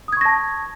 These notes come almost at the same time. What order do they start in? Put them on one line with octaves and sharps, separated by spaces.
D#6 G#6 C#6 A#6 A5